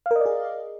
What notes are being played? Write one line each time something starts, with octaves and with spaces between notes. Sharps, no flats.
G#4 A#4 D5 D#5 F5